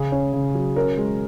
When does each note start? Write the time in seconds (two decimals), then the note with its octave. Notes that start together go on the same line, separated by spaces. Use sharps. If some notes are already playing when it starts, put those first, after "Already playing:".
Already playing: C#3 G#4
0.12 C#4
0.33 C#3
0.55 F#3
0.76 C#4 A#4
0.97 G#3